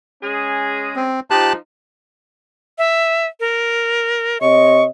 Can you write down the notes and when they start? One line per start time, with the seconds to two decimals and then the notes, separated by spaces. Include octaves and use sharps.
0.23 G#3 C#4 G#4
0.96 C4
1.31 F3 D#4 G4 A5 F#6
2.78 E5
3.40 A#4
4.41 C3 C#5 D#5 C#6